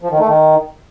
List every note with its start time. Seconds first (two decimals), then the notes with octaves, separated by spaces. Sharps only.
0.02 F3
0.11 D#3
0.20 A3
0.28 D#3